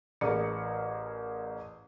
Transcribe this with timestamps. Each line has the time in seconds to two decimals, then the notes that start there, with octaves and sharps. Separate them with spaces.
0.21 A1 G#4 A#4 D5 C#7